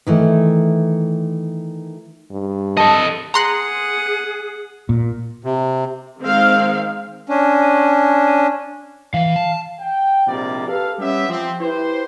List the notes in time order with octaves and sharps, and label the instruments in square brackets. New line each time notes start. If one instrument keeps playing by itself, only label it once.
[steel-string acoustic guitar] D#3 E3 A3
[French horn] G2
[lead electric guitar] A4 D#5 [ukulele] A5
[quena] G#4 [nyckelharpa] F#5 [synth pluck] A#5 C6 F#6
[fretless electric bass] A#2
[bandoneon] C3
[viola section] D#3 G#3 C4 F5
[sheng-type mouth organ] C#4 D4
[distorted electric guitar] E3 E4 [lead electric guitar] F5
[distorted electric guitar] A5
[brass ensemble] G5
A#1 G#2 C3 G3 A#3 D5
G4 A4 B4 F5
G3 B3 C#4 G4 E5
F3 C4
E4 G4 B4 C5